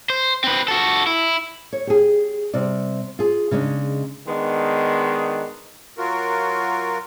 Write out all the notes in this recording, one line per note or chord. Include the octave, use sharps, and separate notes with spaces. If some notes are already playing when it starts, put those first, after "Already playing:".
C5
C4 B4
F#4 A4
E4
C#5
G4 G#4
C3 G3 D5
F4 G#4
C#3 G#3 D4 D#4
D#3 G#3 B3 D4
F#3 F4 F#4 A#4